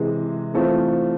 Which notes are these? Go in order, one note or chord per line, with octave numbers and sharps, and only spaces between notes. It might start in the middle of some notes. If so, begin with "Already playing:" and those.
Already playing: C3 E3 G#3
E3 A3 C4 F4